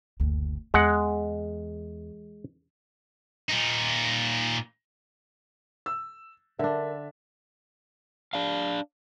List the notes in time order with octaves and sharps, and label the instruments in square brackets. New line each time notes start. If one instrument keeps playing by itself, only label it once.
[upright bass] F#1 D2
[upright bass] E2 [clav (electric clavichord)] G#3 F#5
[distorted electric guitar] A#2 D#4
[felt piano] E6
[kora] D3 D4 [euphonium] A#4 [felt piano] E5
[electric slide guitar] D4 F5